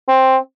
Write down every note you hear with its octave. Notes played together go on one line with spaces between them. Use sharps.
C4